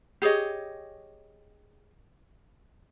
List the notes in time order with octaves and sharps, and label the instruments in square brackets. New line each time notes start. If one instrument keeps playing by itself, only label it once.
[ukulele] G4 G#4 C#5 D#5